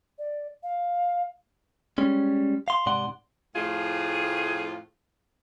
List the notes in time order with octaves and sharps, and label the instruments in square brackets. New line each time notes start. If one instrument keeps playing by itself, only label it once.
[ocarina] D5
F5
[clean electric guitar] G3 G#3 C#4
F5 C6
G#2 C3 D5 F#5 C6
[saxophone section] F2 A2 A3 F4 G#4